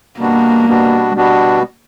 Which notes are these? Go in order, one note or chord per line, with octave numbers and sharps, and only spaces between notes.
B2 G3 A#3 B3 D4 F#4
B2 G3 B3 D4 F#4
B2 G3 B3 D4 F#4